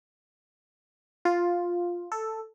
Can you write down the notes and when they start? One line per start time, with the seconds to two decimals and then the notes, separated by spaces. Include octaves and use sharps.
1.25 F4
2.12 A4